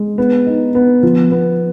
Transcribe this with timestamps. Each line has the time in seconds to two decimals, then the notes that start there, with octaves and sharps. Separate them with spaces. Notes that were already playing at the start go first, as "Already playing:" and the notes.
Already playing: G#3
0.18 B3
0.47 D#4
0.75 B3
1.03 F3
1.31 B3